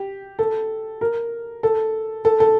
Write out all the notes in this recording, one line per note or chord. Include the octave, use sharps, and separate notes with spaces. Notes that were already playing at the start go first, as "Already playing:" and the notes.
Already playing: G4
A4
A#4
A4
A4
A4